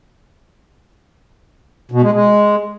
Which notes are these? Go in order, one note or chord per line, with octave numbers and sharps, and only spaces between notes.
B2
G#3
G#3